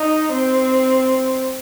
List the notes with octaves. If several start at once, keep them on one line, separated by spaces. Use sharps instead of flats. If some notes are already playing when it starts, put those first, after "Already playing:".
Already playing: D#4
C4